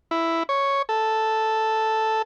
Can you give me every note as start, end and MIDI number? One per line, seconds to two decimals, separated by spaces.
0.11 0.43 64
0.49 0.82 73
0.89 2.22 69